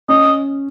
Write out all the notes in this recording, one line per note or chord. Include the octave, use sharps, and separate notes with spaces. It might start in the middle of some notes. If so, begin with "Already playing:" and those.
C#4 D#5